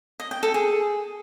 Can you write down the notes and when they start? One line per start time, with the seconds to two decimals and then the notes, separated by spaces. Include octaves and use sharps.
0.20 D#5
0.31 G5
0.43 A4
0.54 G#4